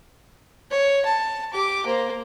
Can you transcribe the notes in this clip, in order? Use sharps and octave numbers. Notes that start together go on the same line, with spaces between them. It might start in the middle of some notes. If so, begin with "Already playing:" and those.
C#5
A5
G4 D6
A#3 C5